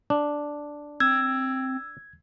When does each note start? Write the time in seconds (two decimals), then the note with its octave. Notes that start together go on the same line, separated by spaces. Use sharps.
0.10 D4
1.00 C4 E6 G#6